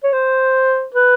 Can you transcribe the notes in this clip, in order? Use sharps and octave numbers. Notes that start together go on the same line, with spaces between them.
C#5
C5
B4